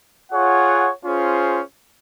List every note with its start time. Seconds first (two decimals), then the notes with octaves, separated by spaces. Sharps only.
0.32 F4 G#4 C#5 F#5
1.04 C#4 F4 G#4 C5